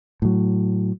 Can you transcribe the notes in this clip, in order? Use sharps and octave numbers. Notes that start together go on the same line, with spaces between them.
A2 F#3